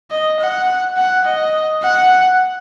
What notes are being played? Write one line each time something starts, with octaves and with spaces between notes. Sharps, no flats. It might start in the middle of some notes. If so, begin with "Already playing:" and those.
D#5
F#5
F#5
D#5
F#5